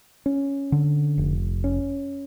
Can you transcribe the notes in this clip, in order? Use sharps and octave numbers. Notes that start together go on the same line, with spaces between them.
C#4
D3
F1
C#4